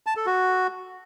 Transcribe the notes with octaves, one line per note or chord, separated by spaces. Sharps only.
A5
A4
F#4